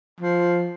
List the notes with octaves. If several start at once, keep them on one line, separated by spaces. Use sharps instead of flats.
F3